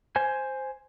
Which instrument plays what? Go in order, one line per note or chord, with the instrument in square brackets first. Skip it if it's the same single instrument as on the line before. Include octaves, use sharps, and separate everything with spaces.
[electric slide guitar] C5 G#5